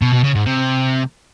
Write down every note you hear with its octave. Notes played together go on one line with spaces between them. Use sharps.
B2
B2
C#3
G#2
C3